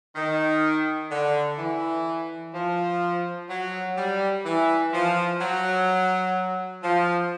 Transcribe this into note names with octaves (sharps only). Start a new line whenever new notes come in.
D#3
D3
E3
F3
F#3
G3
E3
F3
F#3
F3